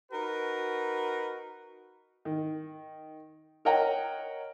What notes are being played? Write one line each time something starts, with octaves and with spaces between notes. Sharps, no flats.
D#4 F#4 A#4 B4
D#3
A#4 C#5 D#5 F#5 G5 A#5